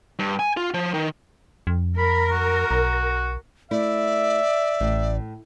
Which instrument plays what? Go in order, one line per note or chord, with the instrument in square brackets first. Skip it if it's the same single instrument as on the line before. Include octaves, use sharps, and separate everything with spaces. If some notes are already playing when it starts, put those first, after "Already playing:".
[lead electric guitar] G2
G#5
F4
F3
D#3
[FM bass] F2
[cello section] A#4 [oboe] B5
[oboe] F#4
[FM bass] B1
[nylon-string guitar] A3 E4 [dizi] D5 [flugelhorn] E5
[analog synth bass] A1 [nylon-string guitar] A2